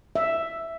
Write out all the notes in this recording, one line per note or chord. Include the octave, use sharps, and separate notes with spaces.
E5